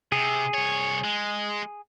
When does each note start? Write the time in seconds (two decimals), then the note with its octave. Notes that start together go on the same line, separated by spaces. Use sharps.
0.12 C3 G#4
0.54 C2 C#5
1.04 G#3